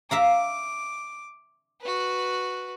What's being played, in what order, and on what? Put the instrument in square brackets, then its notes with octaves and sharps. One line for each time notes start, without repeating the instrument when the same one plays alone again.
[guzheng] E5 F5 A#5 [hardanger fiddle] D6
[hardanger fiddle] F#4 B4